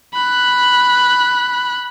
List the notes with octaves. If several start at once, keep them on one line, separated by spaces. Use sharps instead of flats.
B5 F#6